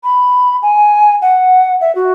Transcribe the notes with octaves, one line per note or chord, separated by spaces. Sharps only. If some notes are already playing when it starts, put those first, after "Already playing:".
B5
G#5
F#5
E5
F#4